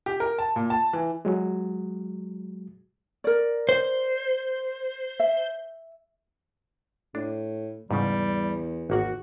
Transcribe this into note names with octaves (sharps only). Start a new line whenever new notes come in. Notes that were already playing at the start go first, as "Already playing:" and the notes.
G4
A#4
A5
A#2
A5
E3
F#3 G#3
A#4 D5
C5
E5
A2 D4
E2 G#2 C#3 G3
G#1 A#3 F#4 F#5